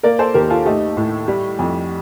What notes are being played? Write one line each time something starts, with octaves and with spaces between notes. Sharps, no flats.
A#3 A#4 D5
A4 C5
D#2 G4 A#4
F4 A4
A3 D#4 G4
A2
G3
F2